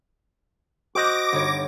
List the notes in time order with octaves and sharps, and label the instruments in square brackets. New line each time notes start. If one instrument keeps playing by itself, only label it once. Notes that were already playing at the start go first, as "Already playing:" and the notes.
[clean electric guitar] F#4 C5 D#5 [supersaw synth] D6 A#6
[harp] G1 D#4 C#5